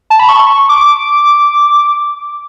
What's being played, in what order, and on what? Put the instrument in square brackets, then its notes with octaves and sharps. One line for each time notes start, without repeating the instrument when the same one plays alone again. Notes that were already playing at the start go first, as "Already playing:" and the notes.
[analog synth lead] A5
B5
C#6
D6